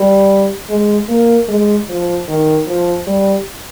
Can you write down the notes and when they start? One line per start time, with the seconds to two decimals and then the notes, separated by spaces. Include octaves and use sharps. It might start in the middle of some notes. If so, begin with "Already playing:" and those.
Already playing: G3
0.70 G#3
1.09 A#3
1.48 G#3
1.89 F3
2.28 D#3
2.68 F3
3.07 G3